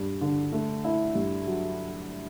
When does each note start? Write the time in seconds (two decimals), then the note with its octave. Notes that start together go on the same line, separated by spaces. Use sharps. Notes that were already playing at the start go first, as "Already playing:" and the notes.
Already playing: G2
0.21 D3
0.52 A3
0.84 E4
1.15 G2
1.47 F#3